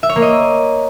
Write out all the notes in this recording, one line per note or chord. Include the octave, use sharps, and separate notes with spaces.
E5
C#5
A#3
D#5